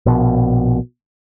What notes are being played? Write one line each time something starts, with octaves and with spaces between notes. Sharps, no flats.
A#1 B2